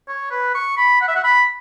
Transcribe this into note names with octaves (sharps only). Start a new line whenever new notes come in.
C#5
B4
C#6
B5
F#5
E5
F#5
B5